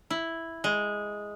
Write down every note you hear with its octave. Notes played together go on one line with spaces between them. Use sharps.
E4
G#3